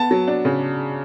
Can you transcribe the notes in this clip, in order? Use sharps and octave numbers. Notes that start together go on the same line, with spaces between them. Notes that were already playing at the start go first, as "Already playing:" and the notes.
Already playing: B3 A5
F#3
D4
C#3